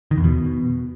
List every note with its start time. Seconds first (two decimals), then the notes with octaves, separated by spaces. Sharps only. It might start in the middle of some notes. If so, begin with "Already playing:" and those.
0.11 D#3
0.17 E2
0.24 B2